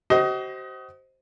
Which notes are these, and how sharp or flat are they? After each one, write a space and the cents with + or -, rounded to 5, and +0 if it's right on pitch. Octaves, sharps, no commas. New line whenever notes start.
F#4 +45 C5 +0 D#5 +20